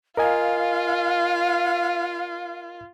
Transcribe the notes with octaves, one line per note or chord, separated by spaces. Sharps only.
F4 A#4 D#5 F5 G#5